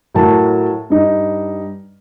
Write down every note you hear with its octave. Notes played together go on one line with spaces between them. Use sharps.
A2 F#3 A#4 A5
G2 D#4